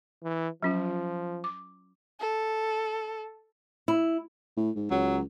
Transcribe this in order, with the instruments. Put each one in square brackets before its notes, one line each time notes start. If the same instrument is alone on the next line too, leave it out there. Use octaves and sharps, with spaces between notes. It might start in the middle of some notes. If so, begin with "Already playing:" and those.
[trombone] E3
[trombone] F3 [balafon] F#3 C#4 F4
[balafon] D6
[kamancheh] A4
[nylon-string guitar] E4
[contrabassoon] A2
G#2
[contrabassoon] C#2 [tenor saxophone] F#3